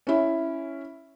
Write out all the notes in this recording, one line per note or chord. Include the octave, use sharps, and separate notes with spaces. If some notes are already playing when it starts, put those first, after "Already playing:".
C#4 E4